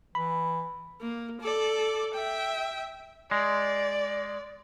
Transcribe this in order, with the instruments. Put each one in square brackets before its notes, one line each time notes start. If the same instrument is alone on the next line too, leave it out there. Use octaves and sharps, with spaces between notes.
[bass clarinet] E3 [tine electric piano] B5
[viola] A#3
A4 D5
E5 G5
[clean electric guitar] G#3 [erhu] D5